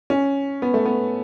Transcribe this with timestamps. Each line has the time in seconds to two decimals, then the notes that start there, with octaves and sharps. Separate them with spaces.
0.10 C#4
0.62 B3
0.74 A3
0.85 B3